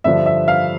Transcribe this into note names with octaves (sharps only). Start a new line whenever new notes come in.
G2 D3 F3 E5
E5
F5